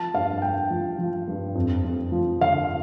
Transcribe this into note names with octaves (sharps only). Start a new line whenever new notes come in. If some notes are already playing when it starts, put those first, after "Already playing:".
Already playing: F3 A5
G2 F5
G2 G5
F3
F3
G2
F2
F2
F3
D3 F5